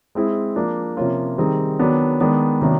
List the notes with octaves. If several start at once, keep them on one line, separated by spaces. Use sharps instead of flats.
G#3 C4 E4 G#4
F3 A#3 D4
C3 F3 A#3 C#4 F4
D#3 G3 C4 D#4 G#4
D#3 F#3 B3 D4
D#3 G#3 B3 D4
C3 D#3 F#3 A#3 D4